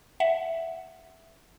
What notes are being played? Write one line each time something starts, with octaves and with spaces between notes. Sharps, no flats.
E5 F#5